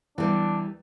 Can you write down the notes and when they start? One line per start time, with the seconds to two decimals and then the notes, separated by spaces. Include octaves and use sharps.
0.18 E2 E3 G3 D4